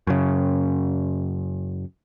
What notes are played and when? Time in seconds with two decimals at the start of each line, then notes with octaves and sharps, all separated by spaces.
0.07 F#2 C#3